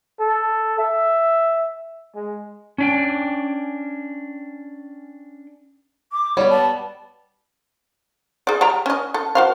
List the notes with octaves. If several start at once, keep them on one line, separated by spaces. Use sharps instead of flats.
A4
E5
G#3
C#4 D4 G5
D6
G3 B3 C#5
A5
G#4 D5
G3 G5 A#5
C#4 D#5
A4
F#4 C5 F5